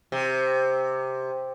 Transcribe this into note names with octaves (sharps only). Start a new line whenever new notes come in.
C3